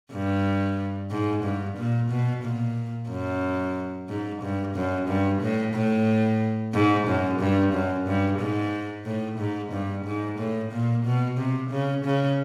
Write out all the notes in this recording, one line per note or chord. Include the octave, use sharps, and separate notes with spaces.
G2
G#2
G2
A#2
B2
A#2
F#2
G#2
G2
F#2
G2
A2
A2
G#2
F#2
G2
F#2
G2
G#2
A2
G#2
G2
G#2
A2
A#2
B2
C3
C#3
C#3